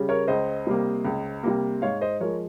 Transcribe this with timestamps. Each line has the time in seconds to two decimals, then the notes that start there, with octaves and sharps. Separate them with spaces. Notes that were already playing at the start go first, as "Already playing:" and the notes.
Already playing: C#3 G3
0.09 A#4 C#5
0.28 C#2 C5 D#5
0.67 C3 G3 A#3
1.05 C#2
1.43 C3 G3 A#3
1.82 G#2 C#5 F5
2.01 C5 D#5
2.20 F3 G#3 A#4 C#5